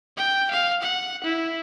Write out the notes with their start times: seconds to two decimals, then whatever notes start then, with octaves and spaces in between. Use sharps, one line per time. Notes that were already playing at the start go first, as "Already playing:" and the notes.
0.18 G5
0.51 F5
0.82 F#5
1.24 E4